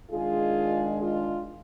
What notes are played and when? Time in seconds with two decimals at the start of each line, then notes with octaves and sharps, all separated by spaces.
0.11 D#3 G#3 D4 F4 G#4
1.01 F4